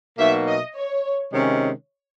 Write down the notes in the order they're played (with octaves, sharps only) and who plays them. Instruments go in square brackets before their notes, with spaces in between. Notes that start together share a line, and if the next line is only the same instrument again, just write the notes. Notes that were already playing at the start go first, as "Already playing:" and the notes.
[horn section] B2 F#3 A#3 D#4 F#4 [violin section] E5
[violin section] D#5
C#5
[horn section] C3 D#3 G#3 C#4